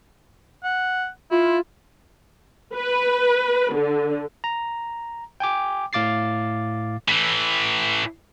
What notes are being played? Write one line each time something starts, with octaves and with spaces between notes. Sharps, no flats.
F#5
E4 F4
B4
D3
A#5
G5 G#5 D6
A2 F5 D6 A6 C7
A2 E3